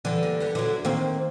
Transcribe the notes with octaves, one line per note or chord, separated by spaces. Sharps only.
D3 E3 G3
A#3
B3 G4 F#5
D3 F#3 E4
D#3 A#3 C4